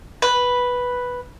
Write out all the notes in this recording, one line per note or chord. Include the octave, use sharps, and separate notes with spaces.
B4